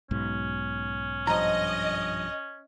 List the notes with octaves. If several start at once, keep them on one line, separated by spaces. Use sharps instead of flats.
B1 G#2 B2 C#4
G2 F3 D#5 A#5